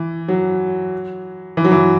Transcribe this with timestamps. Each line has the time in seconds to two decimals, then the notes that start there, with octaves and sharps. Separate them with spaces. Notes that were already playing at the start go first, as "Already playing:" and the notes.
Already playing: E3
0.28 F#3
1.57 E3
1.64 F#3
1.71 E3